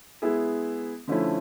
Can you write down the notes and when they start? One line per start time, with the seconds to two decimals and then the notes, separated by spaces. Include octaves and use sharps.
0.22 G#3 B3 E4 G#4
1.08 D3 F3 A3 C#4 E4